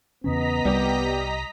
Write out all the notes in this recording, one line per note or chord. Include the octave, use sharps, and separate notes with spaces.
E2 C#3 B3 C#4 D#5 A#5 B6
C2 G3 G4